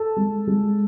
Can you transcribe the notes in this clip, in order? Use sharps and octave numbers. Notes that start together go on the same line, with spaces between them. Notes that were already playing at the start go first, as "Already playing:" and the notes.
Already playing: A4 A5
G#3
G#3